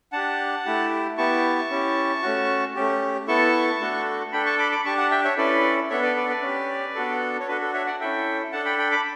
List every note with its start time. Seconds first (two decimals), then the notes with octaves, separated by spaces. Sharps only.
0.12 D4 G4 F#5 A5
0.65 A3 E4 G4
1.18 B3 E4 G4 A5 C#6
1.70 C#4 E4 G4
2.22 A3 C#4 F#4
2.76 A3 C#4 G4
3.28 B3 E4 A4 A5 C#6
3.80 A3 D4 F#4 A4
4.32 D4 A4 G5 B5
4.46 A5 C#6
4.58 B5 D6
4.72 B5 D6
4.85 D4 G4 A5 C#6
4.98 F#5 A5
5.11 E5 G5
5.24 C#5 E5
5.37 C#4 E4 A4 B4 D5
5.90 B3 D4 A4 C#5 E5
6.03 B4 D5
6.16 B4 D5
6.29 B4 D5
6.42 C#4 G4
6.95 B3 D4 F#4 A4
7.40 C#5
7.48 D4 F#4 A4 B4
7.61 A4
7.73 C#5 E5
7.86 D5 F#5
8.00 C#4 E4 A4 E5 G5
8.52 D4 A4 F#5 A5
8.65 G5 B5
8.79 G5 B5
8.91 B5 D6